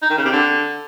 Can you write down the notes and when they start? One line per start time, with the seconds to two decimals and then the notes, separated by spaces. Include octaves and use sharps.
0.02 D#4
0.10 D#3
0.18 C#3
0.25 C3
0.33 D3